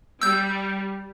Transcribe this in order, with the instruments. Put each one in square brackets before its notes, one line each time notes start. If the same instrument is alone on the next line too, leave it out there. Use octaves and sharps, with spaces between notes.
[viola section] G3 [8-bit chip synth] E6 G6